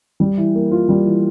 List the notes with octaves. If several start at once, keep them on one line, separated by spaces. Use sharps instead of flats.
G3
E3
A#3
F4
G3
E3